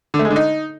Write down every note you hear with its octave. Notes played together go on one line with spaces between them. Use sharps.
D3
A3
G#3
D3
D#4